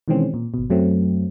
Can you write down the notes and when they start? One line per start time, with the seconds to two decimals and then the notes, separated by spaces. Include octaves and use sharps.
0.08 B2 D#3 E3 G#3 C4 C#4
0.34 A#2
0.54 G#1 B2
0.70 F#2 F#3 A3 C4